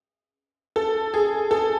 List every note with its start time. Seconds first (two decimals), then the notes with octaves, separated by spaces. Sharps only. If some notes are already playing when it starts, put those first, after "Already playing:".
0.76 A4
1.14 G#4
1.51 A4